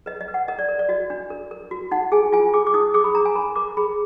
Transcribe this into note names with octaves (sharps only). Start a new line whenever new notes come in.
B4 D#5
D#5
B4
F#5
A#4 D#5
D5
A#4
D5
F#4 D#5
D4
A#4
A#4
F#4
D#4 F#5
G#4 G#5
F4 G#5
G#4 D6
D6
D#4 D#6
G#4 D6
B5
D4 A#5
G#5
A#4 B5
A#4 D6
G#4 B5